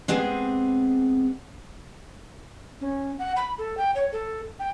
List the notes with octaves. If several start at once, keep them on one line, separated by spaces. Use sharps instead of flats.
G#3 B3 C4 G4 G#4
C#4
F#5
B5
A4
G5
C#5
A4
G5